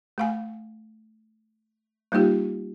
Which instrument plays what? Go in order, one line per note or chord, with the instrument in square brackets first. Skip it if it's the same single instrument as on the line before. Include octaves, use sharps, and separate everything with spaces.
[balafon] A3 F5 G#5
G3 A#3 D#4 F4 G4